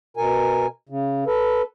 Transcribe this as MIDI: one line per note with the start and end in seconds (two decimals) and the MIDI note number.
0.17 0.66 47
0.17 0.66 70
0.17 0.66 80
0.89 1.24 49
1.27 1.62 69
1.27 1.62 71